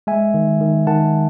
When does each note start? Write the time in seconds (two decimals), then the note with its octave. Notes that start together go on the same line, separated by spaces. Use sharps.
0.07 G#3 E5 G#5
0.34 D#3
0.61 D#3
0.87 D#3 F#5 A5